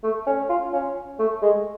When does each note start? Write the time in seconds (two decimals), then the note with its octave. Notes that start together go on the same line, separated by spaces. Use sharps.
0.03 A3
0.26 C#4
0.49 F4
0.73 C#4
1.19 A3
1.42 G#3